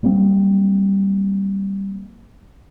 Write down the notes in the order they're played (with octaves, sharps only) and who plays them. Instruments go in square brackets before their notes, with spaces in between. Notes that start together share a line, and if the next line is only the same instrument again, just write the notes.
[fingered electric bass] F#3 G3 A#3 C4